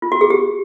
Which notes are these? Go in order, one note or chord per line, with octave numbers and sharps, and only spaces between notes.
F4
F#4
G#4
G4